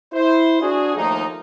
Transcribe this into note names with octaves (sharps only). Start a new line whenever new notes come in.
E4 C5
D4 F#4 G#4
D#2 F3 A3 A#3 D#4